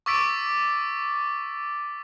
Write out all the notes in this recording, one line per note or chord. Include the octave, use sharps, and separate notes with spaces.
C#6 D6 E6 A6 B6 D7